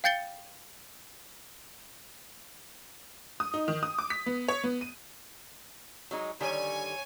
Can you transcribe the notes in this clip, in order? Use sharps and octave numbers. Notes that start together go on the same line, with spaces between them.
F5 G5 G6 A6 C#7 G7
D#6
D#4
D#3
D#6
D6
B6
B3
C#5
B3
D#7
F#3 G#3 D#4
D3 D#3 G3 C#5 G#5